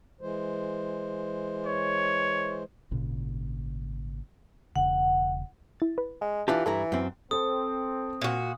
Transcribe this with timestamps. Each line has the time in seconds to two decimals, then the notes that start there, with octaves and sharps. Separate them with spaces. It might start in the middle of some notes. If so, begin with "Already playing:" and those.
0.21 E3 G#3 C5
1.66 C#5
2.91 G#1 A#2 C#3
4.76 E1 C#3 F#5
5.80 E4 A6
5.98 B4
6.21 G#3
6.48 E3 D4 F4 G4 A5
6.66 G2 E3 E4 A4 A#5
6.92 F#2 C4
7.31 C4 A4 C5 D#6
8.21 A#2 F#4